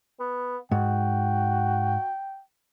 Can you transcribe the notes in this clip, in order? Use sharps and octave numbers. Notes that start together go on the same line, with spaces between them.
B3
G#2 F#4 G5